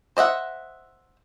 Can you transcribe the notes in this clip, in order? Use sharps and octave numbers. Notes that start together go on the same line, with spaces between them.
C5 D#5 E5 F#5